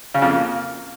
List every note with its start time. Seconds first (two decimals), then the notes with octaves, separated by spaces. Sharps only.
0.14 C#3
0.22 F2
0.30 A#3